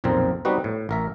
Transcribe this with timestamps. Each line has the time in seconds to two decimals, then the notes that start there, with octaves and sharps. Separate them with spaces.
0.04 B1 F2 A#2 C4 A#4
0.45 G3 B3 C4 D#4 F#4 B4
0.64 A2
0.89 A1 A#4 E5